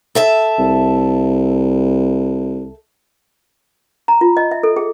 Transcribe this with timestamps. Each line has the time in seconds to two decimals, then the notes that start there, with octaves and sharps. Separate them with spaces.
0.15 A4 E5 A5
0.58 C2
4.08 A#5
4.21 F4
4.37 D#5
4.51 E5
4.63 A4
4.76 G#4